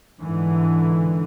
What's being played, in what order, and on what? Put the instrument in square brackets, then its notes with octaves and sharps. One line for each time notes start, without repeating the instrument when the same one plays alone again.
[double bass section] G#2 D3 E3